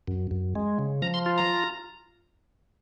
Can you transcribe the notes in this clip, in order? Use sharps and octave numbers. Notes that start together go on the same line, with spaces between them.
F#2
F#2
G#3
C#3
F3 A#5
C6
F4
A#5